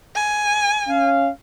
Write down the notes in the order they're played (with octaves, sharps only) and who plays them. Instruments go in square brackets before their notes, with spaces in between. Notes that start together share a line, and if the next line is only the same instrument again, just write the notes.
[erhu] G#5
[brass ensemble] C#4 F5